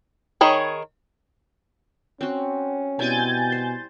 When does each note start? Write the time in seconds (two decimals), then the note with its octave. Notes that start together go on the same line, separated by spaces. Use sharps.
0.41 D#3 G#4 C#5 B5
2.21 C4 C#4 F#4
2.99 B2 G3 C4 E4 G#5 G6 A6
3.52 C5